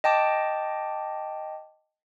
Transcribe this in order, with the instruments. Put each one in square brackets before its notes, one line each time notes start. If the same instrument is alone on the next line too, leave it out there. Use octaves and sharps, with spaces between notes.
[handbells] D#5 G5 A5 D6